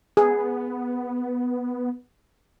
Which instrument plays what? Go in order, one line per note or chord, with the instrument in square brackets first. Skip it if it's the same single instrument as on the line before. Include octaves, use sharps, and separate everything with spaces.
[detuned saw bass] B3 [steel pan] G#4